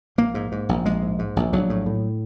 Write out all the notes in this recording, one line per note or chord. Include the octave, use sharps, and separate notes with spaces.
A#1 A#3
G#2
G#2
A#1
A#1 G#3
G#2
G#2
A#1
A#1 F#3
A2
A2